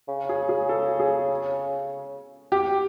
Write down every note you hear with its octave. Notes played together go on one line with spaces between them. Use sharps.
C#3
G#4
G#4
A4
G#4
G4